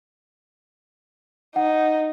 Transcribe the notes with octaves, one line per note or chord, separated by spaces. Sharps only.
D#4 F#5